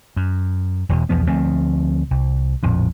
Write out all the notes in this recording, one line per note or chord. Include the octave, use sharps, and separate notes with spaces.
F#2
E1 E2 B2
B1 E2 F3 B3
D2 F3 A3 C4
C2
A#1 F2 A2